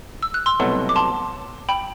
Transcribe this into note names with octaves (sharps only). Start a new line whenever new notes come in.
E6
F#6
C6 E6
C2 B2 F#3 A3
D6
A5 C6
G5 B5